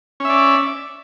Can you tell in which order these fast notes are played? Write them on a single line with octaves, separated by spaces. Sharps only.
C#4 E5 D5